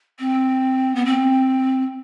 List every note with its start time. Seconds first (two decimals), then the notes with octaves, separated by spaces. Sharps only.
0.19 C4
0.95 B3
1.05 C4